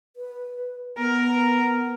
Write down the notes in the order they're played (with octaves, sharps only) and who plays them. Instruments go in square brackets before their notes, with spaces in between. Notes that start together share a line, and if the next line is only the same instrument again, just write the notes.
[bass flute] B4
[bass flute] B3 [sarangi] A#4